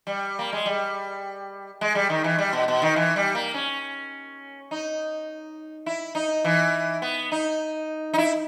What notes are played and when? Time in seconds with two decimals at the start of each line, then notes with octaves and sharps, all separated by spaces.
0.07 G3
0.39 A#3
0.53 G#3
0.66 G3
1.81 G#3
1.95 G3
2.10 D#3
2.24 E3
2.38 G3
2.53 B2
2.68 B2
2.82 D#3
2.96 E3
3.16 G3
3.35 A#3
3.54 C#4
4.71 D#4
5.86 E4
6.15 D#4
6.44 E3
7.02 B3
7.32 D#4
8.13 D#4
8.18 E4